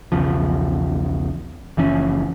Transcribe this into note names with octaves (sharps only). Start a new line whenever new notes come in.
B1 E2 C#3 F3
F#1 E3 F3 C#4